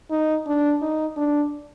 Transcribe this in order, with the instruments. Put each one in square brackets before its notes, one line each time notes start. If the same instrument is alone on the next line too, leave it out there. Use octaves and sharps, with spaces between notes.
[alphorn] D#4
D4
D#4
D4